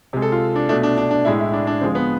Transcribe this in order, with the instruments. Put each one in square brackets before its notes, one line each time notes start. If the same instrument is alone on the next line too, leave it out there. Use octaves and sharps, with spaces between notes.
[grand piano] C3 G#3
A4
F4
D4
B2 A3 D4
D4
D4
D4
A2 G#3 E4
E4
D4
D4
D3 F3 G#3 C4
B3